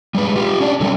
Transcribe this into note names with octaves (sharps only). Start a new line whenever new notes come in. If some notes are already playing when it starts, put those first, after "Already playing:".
G3 G#3 B4
F4 G4
C#4 D4 D5
D3 F#3 G3 C4